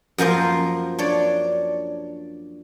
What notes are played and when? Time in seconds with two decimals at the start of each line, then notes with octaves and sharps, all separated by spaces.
0.18 F#2 F3 A#3 C5
0.98 D4 C#5 D5